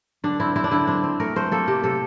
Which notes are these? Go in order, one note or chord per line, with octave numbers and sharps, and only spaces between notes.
D3 D4
C4 E4
C4 E4
D4
D3 E4
C4 D4
C4
A3 A#4
A3 C5
A#3 A4
C3 G4
C3 A4